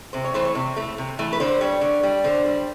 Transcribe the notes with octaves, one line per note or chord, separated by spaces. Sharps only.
C3 C5
C#5
E3 A3 C5
C#5
C3
E3 A3
C3
E3 A3
B4
D3 C5
G3 C#5
D3
G3
D3 C5
G3